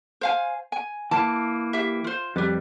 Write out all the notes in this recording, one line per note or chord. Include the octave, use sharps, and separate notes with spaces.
C5 F5 G#5
G#5
E3 A#3 A5
G4 E5
F4 C5
F2 G3 G4 B4